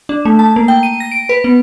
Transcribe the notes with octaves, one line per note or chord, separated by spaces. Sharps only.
D4
A3
A5
A#3
G5
D#7
A#6
D7
B4
B3